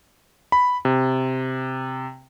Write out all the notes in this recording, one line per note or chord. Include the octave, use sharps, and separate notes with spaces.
B5
C3